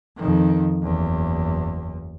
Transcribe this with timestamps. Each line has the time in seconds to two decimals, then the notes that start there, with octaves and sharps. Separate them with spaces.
0.17 F2 D#3
0.83 F#1 E2